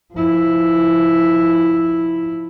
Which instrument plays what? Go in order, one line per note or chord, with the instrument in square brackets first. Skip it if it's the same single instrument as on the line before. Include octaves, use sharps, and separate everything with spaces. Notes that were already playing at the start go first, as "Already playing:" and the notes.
[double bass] F3 E4